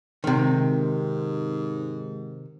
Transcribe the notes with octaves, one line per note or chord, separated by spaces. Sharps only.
G#2 C3 D#3